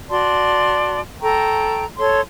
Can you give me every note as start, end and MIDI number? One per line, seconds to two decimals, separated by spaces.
0.09 1.00 66
0.09 1.00 74
0.09 1.00 81
0.09 1.00 84
1.22 1.84 69
1.22 1.84 79
1.22 1.84 82
1.22 1.84 85
1.98 2.20 69
1.98 2.20 73
1.98 2.20 84